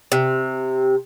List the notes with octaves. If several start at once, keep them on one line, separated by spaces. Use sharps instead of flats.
C3